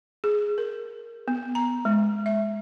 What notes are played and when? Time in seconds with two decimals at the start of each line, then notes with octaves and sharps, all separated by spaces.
0.24 G#4
0.58 A#4
1.28 B3
1.55 A#5
1.85 G#3
2.26 E5